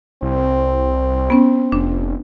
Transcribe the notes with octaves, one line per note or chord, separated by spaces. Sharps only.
C2 C4
B3 C#4
F1 D4